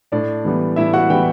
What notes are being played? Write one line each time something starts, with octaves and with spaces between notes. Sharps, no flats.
A2 D4 D5
E3 G3 B3
A2 E4 E5
F#4 F#5
E3 G3 B3 G4 G5